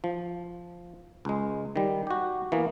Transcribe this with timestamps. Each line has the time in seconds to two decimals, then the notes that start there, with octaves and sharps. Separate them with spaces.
0.04 F3
1.25 C#2 G#3
1.76 D#3 G3
2.07 F#4 G4
2.52 E3 A#3 B3